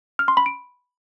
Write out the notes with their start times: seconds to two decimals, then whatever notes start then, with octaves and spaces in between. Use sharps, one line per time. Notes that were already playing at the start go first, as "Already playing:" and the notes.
0.19 F6
0.28 C6
0.37 B5
0.46 D7